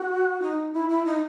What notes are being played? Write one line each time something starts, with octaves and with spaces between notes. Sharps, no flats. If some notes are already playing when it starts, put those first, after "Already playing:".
Already playing: F#4
D#4
E4
E4
D#4